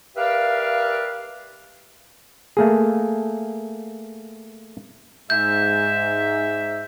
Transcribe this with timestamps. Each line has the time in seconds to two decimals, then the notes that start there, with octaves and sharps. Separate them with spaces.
0.16 G4 A#4 B4 D5 E5 F5
2.57 A3 A#3 G#4
5.30 G#2 E5 G6